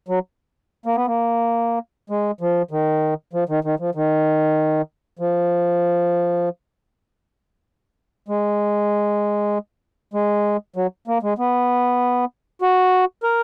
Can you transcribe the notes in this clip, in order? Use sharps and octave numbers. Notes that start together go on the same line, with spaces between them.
F#3
A#3
B3
A#3
G#3
F3
D#3
F3
D#3
D#3
F3
D#3
F3
G#3
G#3
F#3
A#3
G#3
B3
F#4
A#4